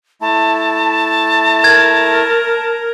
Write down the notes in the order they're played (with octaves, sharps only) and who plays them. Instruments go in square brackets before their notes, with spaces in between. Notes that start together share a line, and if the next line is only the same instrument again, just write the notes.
[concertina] A3 E4 [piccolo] A5
[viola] A#4 [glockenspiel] G#6